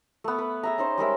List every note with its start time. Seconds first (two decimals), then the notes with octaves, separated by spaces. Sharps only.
0.24 A3 B3
0.38 B4
0.63 G#4 E5 A#5
0.78 C#4 D#4 C5
0.98 G3 G#3 A#4 E5